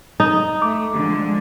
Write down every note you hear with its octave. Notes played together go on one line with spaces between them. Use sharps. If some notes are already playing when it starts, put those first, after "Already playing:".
D#4
A3 D6
D3 F3 G#3